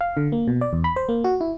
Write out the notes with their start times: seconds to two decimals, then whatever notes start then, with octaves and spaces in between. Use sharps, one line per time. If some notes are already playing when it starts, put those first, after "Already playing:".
0.01 F5
0.17 D3
0.32 A#3
0.47 B2
0.61 D5
0.73 E2
0.84 B5
0.96 C5
1.09 A#3
1.24 F#4
1.41 E4